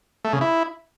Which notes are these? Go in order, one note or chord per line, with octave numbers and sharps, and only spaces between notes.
A3
C#3
E4